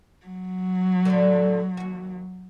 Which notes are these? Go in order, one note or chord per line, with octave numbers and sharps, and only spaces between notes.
F#3
A2 D3
D#2 F#4